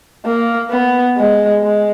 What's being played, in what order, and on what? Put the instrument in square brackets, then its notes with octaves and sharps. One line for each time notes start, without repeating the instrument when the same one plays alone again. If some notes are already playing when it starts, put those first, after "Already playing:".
[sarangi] A#3
B3
G#3
G#3